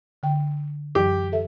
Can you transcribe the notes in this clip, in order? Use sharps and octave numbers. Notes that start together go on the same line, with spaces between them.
D3 G5
F#2 E3 F#3 G4
G4 A4 E5